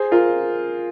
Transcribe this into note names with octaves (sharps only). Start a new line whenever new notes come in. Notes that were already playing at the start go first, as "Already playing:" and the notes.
Already playing: G#4 C5
F4 A#4